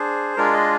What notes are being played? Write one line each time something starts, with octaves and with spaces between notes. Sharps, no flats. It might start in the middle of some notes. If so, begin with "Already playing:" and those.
Already playing: D4 G#4 C5
G#3 D4 F4 G#4 A#4
D#5